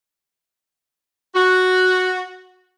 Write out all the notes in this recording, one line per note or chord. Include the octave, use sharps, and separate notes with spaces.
F#4